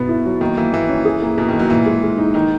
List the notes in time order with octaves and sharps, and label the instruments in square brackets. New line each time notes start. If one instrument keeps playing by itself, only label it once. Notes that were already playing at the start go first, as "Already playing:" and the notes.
Already playing: [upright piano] B2 B3 [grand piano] E3
[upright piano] E4
F#3
[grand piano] D#3 [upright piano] A#3
[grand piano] E3 [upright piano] A#3
[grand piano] E3 [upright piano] A#3
[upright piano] C#4
G#4
A#3
[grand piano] B2 [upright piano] A#3
[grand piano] D#3
[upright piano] A#3
[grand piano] F#3
[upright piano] A#2 [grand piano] E3
[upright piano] G#3
G#3
D#4
[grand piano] D#3 [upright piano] D#4